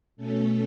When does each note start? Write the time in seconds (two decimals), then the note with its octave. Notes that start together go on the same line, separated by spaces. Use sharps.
0.17 B2 A3 C#4 A4